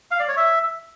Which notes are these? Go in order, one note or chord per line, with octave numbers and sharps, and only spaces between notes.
F5
D5
C#5
E5